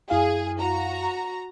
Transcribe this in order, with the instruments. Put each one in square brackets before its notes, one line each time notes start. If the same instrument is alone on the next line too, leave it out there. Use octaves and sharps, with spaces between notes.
[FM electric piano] F#2 E4 F5 [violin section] G#4
[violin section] F#4 A#5